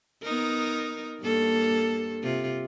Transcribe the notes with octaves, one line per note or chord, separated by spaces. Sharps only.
B3 D#4 A#4
G2 A#3 A4
C3 F4